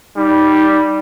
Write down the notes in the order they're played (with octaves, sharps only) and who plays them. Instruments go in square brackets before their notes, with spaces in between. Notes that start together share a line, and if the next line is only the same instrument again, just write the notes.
[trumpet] G3 [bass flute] D#4